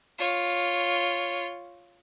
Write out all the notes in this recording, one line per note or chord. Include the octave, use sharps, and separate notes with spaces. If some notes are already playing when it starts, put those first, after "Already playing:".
F4 C#5